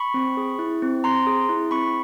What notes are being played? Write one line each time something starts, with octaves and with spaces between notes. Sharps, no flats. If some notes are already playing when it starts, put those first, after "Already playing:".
Already playing: B5 C#6
C4
G#4
E4
C4
C4 A#5 C6
G#4
E4
C4 B5 C#6